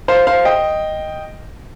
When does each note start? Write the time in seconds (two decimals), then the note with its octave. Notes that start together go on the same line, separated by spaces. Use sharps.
0.08 C5 F5
0.27 C5 F5
0.45 D#5 G5